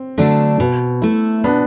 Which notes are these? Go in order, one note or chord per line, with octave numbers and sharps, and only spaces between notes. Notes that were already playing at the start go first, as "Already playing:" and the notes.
Already playing: C4
D3 F#3 A3 D4
B2
A3 E4
B2 B3 D4